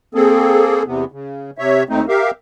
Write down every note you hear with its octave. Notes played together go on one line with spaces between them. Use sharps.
A#3 C4 G#4 A4
E2 C3 B3
C#3
C3 C#5 E5
D#2 A3 C4 D#4
G4 A#4 E5 F5